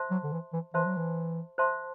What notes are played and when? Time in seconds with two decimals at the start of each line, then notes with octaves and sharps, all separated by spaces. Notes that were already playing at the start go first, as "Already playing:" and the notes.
Already playing: C5 E5 A5 C6
0.11 F#3
0.24 D3
0.32 E3
0.53 E3
0.74 E3 C5 E5 A5 C6
0.85 F#3
0.97 E3
1.58 C5 E5 A5 C6